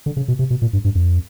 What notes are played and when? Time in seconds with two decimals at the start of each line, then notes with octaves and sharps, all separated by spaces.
0.06 D3
0.17 C#3
0.28 B2
0.39 C3
0.50 B2
0.62 A#2
0.73 G2
0.85 G2
0.95 F2